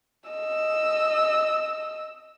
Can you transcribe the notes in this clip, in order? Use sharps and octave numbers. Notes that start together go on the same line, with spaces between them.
D#5 E6